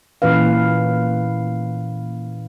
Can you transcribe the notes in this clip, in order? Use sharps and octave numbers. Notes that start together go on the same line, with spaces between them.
A#2 E3 C#4 B4 F5